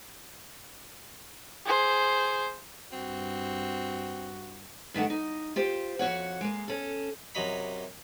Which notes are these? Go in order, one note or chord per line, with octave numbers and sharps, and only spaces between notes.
G#4 C5
G2 C4 F#4
G2 D#3 A3 F#5
D#4
F4 G4 C5
F2 F#4 C#5 F#5
G#3 A#3
C#4 A4
F#2 C3 F#3 D#5 B5